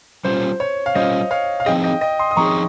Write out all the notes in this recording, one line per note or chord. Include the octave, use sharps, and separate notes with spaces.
G3 C#4 F4 C5
C#5
F5
G3 C#4 F4 C5 D#5
C#5 F5
F5
F3 C4 D#4 G#4 D#5 G5
D#5 G5
D#5 G5
C6 D#6
D#6
F3 C4 D#4 G#4 A#5 C#6